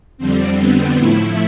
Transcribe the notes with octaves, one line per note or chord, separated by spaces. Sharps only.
F2 D3 G3 C4
B3
A2 F3 A3 E4